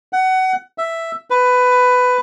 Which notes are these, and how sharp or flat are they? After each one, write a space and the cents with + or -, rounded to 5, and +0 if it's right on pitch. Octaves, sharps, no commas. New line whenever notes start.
F#5 +25
E5 +0
B4 +15